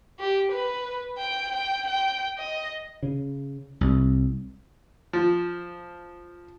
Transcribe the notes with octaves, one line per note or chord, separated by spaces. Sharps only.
G4
B4
G5
G5
G5
D#5
C#3
C2
F3